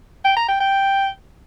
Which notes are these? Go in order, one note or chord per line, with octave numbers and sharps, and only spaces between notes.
G5
A#5
G5
G5